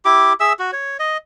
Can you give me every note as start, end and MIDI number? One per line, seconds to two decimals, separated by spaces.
0.05 0.33 64
0.05 0.33 67
0.05 0.33 86
0.40 0.53 68
0.40 0.53 76
0.40 0.53 88
0.59 0.71 66
0.73 0.97 73
0.99 1.17 75